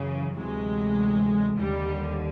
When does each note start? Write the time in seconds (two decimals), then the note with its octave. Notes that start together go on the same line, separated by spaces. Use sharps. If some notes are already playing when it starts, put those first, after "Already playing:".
Already playing: F#2 C#3 E3
0.36 D2 C3 E3 F#3 G#3
1.57 D#2 D3 G3